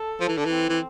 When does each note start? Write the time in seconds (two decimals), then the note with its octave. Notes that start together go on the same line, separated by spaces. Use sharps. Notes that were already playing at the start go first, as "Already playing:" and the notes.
Already playing: A4
0.20 F3
0.28 E3
0.37 D3
0.45 E3 C4
0.69 E3